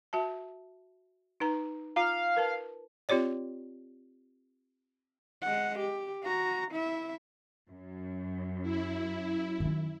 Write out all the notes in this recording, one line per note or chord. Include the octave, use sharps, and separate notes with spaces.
F#4 E5 A5
D#4 B4 A#5
F4 F5 A#5
A#4 B4 A5
C4 F4 G4 C#5 D5
G#3 F#5
G4
F#4 A#5
E4 E5
F#2
E4
D#3 C#4